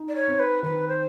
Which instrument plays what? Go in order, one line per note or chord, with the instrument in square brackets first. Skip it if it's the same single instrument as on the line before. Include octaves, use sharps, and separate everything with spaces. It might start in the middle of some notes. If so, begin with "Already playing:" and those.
Already playing: [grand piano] D#4
[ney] D5
C#5
[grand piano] C4
[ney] B4
[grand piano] D#3 [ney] B4
[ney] C5